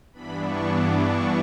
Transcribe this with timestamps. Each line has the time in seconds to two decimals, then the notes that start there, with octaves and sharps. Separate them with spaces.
0.13 G2 E3 B3 D4 B5
0.43 C#6
0.73 D6
1.03 C#6